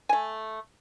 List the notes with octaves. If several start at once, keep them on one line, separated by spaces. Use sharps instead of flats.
A3 G#5